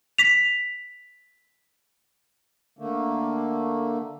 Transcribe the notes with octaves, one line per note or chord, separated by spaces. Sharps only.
B6 F7
D3 A3 A#3